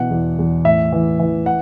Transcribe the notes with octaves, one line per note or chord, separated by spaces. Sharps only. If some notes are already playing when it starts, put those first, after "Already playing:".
Already playing: B2 E3 F#5
E2
E2
A2 E5
E3
E3
F#5